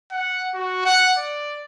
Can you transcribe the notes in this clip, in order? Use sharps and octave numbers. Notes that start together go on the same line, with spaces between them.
F#5
F#4
F#5
D5